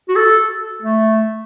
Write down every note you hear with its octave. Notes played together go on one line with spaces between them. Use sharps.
F#4
A4
A3